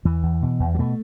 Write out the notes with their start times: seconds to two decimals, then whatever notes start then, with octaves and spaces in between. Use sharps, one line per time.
0.05 E2 E3
0.23 E2
0.42 B2
0.60 E2
0.75 F#3
0.79 B2 A3